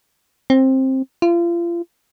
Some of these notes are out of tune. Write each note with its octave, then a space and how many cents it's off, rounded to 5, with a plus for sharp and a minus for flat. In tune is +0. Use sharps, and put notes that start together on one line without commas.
C4 +15
F4 -35